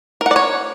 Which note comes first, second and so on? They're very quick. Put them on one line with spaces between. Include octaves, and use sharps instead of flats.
A#4 F#5 D5 C#5